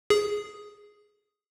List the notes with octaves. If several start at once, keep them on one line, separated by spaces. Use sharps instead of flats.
G#4